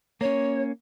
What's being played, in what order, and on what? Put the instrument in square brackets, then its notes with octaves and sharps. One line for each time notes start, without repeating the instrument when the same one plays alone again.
[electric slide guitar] A#3 C#4 [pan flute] C#5